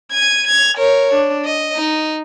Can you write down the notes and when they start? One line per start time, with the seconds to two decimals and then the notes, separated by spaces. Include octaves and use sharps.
0.12 G#6 D#7
0.47 G#6 F7
0.78 A#4 C#5
1.14 D4
1.45 D#5
1.76 D#4